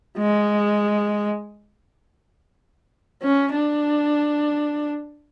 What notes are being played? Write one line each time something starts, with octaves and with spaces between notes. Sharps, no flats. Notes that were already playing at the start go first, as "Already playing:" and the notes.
G#3
C#4
D4